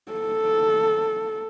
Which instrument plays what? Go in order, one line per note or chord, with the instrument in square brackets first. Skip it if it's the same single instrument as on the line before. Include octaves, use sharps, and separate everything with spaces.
[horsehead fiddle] A4